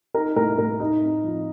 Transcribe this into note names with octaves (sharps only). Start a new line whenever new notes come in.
D#4 A#4
A2 A#4
A2 A#4
D#4 D#5
C4
F3